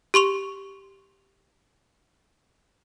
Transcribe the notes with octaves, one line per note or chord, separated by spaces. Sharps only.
G4 C6 C#6 F7